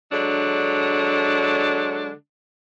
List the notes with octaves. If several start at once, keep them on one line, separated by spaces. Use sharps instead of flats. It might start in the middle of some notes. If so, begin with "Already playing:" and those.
D3 F#3 G#3 D4